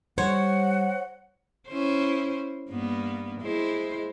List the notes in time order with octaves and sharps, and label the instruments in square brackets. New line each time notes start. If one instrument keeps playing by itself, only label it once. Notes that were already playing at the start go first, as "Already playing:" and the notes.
[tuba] G3 [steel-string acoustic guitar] C5 [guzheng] C#5 [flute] F#5
[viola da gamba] C#4 E4 C5
G2 A#3 B3
G#3 E4 C5